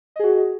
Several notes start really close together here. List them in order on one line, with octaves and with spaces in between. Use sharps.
D#5 G#4 F#4